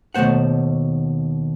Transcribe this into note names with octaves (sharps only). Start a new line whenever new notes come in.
D#2 B2 A3 C5 F#5